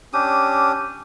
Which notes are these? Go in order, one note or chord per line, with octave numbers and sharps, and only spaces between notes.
C#4 D4 G4 D#6